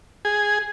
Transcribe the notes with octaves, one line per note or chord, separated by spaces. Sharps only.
G#4